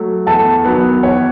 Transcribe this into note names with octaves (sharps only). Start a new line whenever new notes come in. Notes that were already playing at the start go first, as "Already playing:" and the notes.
Already playing: F#3 A3
E2 A4 A5
D#3 F#3 B3 B4
E2 C#5